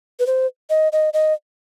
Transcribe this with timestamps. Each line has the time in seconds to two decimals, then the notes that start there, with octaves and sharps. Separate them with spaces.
0.20 B4
0.27 C5
0.70 D#5
0.92 D#5
1.14 D#5